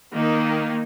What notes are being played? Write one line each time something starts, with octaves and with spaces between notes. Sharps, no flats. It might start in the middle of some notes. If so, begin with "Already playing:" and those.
D#3 A#3 D#4